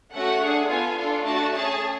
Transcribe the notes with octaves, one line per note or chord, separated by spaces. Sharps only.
A3 C#4 F#4 F#5
D4 G#4
B3 F4 A4 G#5
D4 F4 A4
A3 D4 F#4 A5
C#4 G#4 A5